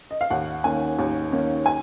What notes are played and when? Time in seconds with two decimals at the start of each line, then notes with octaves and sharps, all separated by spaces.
0.11 D#5
0.21 F5
0.30 D#2 F#5
0.64 D#3 A#3 C#4 G#5
0.99 D#2
1.32 D#3 A#3 C#4
1.66 G#5